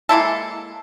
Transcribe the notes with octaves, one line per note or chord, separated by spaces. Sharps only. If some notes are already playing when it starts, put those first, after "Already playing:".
G#3 A#3 E4 A4